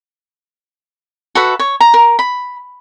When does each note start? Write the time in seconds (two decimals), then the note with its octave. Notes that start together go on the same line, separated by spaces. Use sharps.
1.35 F#4 A4 B4 E5
1.59 C#5
1.80 A#5
1.94 A#4
2.19 B5